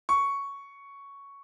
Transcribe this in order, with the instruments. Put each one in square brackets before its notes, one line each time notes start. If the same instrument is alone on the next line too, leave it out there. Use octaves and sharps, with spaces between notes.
[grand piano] C#6